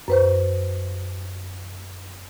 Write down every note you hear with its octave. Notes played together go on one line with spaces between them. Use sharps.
F#2 B4 C5